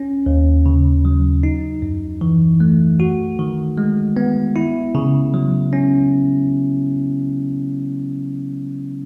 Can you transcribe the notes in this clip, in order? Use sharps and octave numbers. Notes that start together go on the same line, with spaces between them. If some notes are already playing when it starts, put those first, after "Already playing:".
Already playing: C#4
D#2
C#3
F#3
D#4
F#2
E3
A3
F#4
D#3
G#3
B3
E4
C#3
F#3
C#4